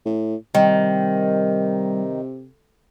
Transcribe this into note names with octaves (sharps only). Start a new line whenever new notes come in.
A2
C3 D#3 G3